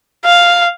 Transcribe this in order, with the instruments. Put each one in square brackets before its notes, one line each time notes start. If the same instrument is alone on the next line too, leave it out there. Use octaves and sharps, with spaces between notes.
[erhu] F5